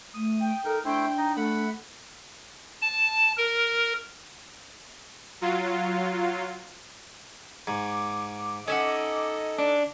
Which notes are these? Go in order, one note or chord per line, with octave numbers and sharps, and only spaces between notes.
A3 D#6
G5
D#4 A4 A#4
A3 D4 E4 C5 G5
D#4 D#5
A3 F#5 B5
A5
A#4
F#3 F4
G#2 D6
C#4 D#4 A4 D#5 E5 F#5
D4